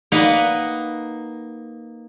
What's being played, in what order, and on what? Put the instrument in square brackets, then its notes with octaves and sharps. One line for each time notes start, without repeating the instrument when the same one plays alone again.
[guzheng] A#3 D#4 B4 D#5 F#5